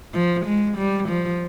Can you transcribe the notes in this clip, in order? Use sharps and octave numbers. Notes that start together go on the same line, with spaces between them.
F3
G#3
G3
F3